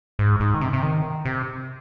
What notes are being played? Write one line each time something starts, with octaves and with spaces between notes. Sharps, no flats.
G#2
G#2
D#3
C3
C3
D#3
C3